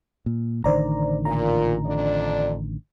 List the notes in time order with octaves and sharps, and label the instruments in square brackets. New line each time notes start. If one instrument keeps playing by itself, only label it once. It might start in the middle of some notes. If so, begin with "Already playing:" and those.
[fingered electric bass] A#2
[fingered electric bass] A1 D3 D#3 [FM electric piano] C5 D5 A#5
[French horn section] A#2 [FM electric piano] A#5
[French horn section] F2 D4 D5